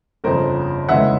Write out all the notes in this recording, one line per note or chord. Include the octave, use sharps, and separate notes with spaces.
G1 F2 C#3 A#4 C5
F1 D#2 C#3 E3 G#3 E5 F#5